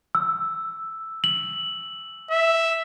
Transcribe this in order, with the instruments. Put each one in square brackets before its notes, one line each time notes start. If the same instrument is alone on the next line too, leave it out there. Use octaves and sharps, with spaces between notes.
[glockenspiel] E6
F#7
[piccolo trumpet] E5